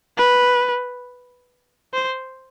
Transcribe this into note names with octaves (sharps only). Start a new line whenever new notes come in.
B4
C5